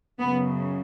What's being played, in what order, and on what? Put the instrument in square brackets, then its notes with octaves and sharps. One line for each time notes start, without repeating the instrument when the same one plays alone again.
[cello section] F#2 C#3 B3